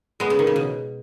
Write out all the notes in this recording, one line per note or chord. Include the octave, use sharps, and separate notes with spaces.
G#3 B3
C#3
D#3
C#3
B2